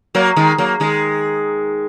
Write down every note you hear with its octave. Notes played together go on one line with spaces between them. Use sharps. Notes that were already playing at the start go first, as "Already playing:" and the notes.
F#3 A#3
D#3 G#3
F#3 A#3
D#3 G#3